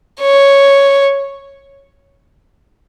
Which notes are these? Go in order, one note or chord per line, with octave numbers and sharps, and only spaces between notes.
C#5